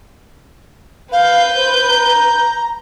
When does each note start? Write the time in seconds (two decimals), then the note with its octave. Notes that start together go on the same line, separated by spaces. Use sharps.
1.12 B4 F5 G6
1.55 C5
1.88 A#5